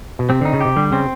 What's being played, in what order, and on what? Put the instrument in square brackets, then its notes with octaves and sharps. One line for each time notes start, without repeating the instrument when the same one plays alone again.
[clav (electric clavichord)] B2
[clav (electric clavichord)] C3 [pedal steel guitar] C4
[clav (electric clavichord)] D3 [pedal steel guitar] D#4
[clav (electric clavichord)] C#3
[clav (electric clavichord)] C3 [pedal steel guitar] G4
[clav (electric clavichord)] D3 [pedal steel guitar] G3
[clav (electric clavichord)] C#3 [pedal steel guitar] C4